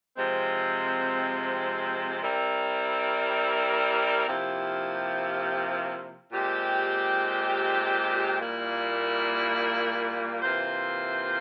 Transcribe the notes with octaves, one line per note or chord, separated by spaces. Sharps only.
C3 F3 G#3 C4
G3 C4 E4 A#4
C3 F3 A#3 E4 G4
A#2 G#3 C4 G4
A#2 G3 A#3 E4
C3 E3 A#3 F4 C5